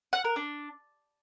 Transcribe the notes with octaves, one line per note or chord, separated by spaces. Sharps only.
F#5
A#4
D4